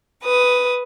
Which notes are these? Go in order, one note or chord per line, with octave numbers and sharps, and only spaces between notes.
B4 D#6